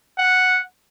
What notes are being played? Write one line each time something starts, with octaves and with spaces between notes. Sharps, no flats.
F#5